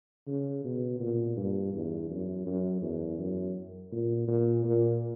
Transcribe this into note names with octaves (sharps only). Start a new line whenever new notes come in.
C#3
B2
A#2
G2
E2
F#2
F#2
E2
F#2
A#2
A#2
A#2